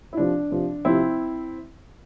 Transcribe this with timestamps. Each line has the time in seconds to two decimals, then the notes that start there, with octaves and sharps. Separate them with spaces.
0.13 E4
0.17 C3 F3 D4
0.51 C3 F3
0.85 C3 F3 C4 E4